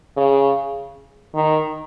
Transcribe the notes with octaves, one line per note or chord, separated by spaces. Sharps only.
C#3
D#3